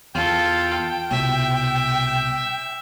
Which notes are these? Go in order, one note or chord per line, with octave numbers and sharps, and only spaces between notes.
E2 F4 A4 G5
C2 B2 E5